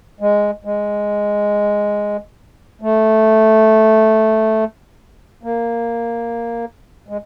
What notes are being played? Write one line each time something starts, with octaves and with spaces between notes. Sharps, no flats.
G#3
G#3
A3
A#3
G#3